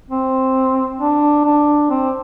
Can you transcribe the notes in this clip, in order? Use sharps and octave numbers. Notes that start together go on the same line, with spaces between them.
C4
D4
D4
C4